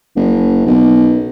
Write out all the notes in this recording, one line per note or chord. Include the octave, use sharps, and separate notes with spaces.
F#1
B1